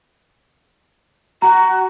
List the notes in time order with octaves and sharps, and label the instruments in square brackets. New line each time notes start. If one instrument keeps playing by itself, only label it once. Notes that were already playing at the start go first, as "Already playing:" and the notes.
[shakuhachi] F#4 [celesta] A#5